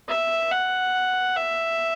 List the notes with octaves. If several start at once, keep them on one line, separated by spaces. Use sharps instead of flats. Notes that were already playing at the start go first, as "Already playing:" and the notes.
E5
F#5
E5